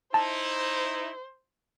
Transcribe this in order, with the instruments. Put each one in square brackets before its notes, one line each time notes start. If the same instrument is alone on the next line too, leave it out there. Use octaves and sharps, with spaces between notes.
[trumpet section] D#4 E4 [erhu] C5 [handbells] A5